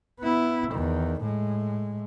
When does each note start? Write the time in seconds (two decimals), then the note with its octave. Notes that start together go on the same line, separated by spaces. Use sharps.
0.19 B3 E4
0.71 E2 D#3
1.20 A2 G#3